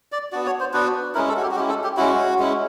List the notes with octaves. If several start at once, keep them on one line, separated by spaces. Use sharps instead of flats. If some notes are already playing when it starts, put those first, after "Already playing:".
D5
B3 D4 F#4 D5
C#5
C5
B3 D4 F#4 B4
G#3 C#4 E4 A#4
A4
F#4
G4
F#4
G#3 C#4 E4 G4
A4
G4
G#3 C#4 E4 F#4
G#3 C#4 E4